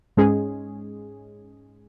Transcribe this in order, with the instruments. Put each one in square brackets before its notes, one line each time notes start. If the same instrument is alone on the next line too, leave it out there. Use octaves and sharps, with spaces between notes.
[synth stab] G#2 G#3 C#4 G#4